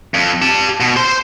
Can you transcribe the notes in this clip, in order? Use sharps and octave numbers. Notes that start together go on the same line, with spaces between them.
F2
G4 A5
B2
C5 C6